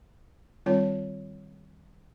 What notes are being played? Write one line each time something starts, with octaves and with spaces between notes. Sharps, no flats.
D#3 G3 C4 F4 C#5 A5